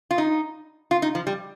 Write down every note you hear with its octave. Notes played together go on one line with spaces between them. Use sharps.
F4
D#4
F4
D#4
F3
G3